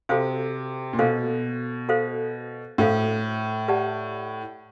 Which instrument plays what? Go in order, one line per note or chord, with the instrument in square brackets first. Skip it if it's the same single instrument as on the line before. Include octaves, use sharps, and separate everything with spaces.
[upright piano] C3 [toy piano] F#4 A4 C5 F5
[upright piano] A#2
[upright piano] B2 [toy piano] F#4 A4 C5 F5
[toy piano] F#4 A4 C5 F5
[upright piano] A2 [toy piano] F#4 A4 C5 F5
[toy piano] G4 B4 D5 F#5 A5